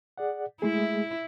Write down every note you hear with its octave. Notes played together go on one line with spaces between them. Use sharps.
G#4 D5 F#5
G#3 A3 E4 G#4